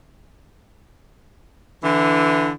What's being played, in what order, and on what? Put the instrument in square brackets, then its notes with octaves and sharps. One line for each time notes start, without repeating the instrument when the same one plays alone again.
[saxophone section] D3 E3